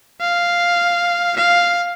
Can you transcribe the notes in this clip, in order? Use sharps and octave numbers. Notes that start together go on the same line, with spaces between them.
F5
F5